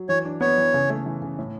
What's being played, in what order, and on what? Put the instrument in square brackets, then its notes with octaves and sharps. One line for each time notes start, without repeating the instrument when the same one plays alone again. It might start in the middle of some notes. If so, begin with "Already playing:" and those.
Already playing: [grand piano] F#3
[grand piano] E3 [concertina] C#5
[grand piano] D4
[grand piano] B3 [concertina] C#5
[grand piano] E3
C#3
A3
E3
C#3
A2